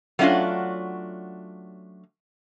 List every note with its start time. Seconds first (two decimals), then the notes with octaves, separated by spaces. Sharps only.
0.19 F#3 A3 C#4 D4 F4 F#4